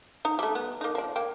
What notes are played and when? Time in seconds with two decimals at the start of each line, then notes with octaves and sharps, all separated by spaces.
0.25 D#4 A#5
0.39 G3 A3
0.55 B3
0.81 A#3 D#4
0.95 F3 D5
1.16 A#3 G5